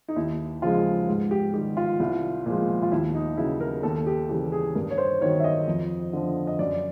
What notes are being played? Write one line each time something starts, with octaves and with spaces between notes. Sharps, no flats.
D#4
D#2 E4
C#3 F3 G#3 F4
G#2
G4
D#3 G3 G4
F4
C2
A#2 F3 G#3
F4
D#2 E4
D#4
C#3 F#3 E4
A#4
D#2 A4
G4
C#3 E3 G3 G4
G#4
G2 A#4
C#5
C5
D#3 F#3 C#5
E5
D#5
F2
D3 F3
D#5
F#2 D5